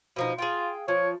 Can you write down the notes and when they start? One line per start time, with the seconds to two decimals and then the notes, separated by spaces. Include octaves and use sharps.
0.16 B2 F3 D#4
0.38 F4 G#4 F5 G5
0.88 F3 C#5